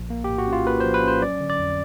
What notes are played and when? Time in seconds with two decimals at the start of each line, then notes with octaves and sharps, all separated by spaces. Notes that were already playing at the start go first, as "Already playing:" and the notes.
Already playing: A#1
0.10 A#3
0.24 G4
0.30 A2
0.38 F#4
0.47 C#4
0.53 F4
0.66 A#3 B4
0.80 F3 C5
0.94 B4
1.03 C#4 C5
1.22 F#3 D5
1.40 D3
1.49 D5
1.59 F2